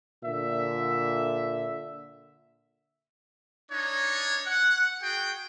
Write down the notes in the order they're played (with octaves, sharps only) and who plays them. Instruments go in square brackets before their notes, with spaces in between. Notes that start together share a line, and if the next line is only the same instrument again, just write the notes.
[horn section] A#2 D3 E5
[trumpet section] D4 D#4 C#5
F#5
F#4 G#4 G5